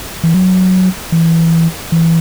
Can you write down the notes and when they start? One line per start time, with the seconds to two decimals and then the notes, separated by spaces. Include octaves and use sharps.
0.23 E3
0.34 F#3
1.12 E3
1.92 E3